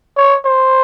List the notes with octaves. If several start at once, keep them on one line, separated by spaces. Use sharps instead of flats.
C#5
C5